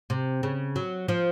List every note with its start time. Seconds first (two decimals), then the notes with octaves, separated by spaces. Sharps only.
0.10 C3
0.43 C#3
0.76 F#3
1.08 F3